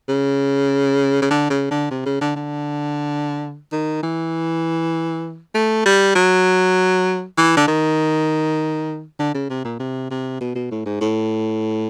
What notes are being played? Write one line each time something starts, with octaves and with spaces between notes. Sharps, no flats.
C#3
C#3
D3
C#3
D3
C3
C#3
D3
D3
D#3
E3
A3
G3
F#3
E3
D3
D#3
D3
C#3
C3
A#2
C3
C3
B2
B2
A2
G#2
A2